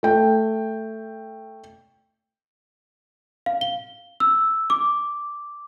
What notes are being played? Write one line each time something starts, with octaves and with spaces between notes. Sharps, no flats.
A3 G5
F5
G7
E6
D6